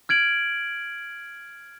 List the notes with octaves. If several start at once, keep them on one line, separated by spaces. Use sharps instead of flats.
F6 G#6 D7 F#7